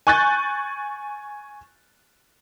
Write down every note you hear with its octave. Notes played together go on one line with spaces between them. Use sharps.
G#5 C#6 F#6 G6 A6